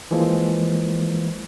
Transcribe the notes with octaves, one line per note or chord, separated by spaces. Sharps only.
E3 F3 G#3 A#3